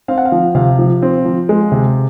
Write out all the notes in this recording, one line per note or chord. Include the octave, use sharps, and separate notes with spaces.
C4 F5
F#5
F5
F3
C3 F5
F3
C4
F3
G#3
C3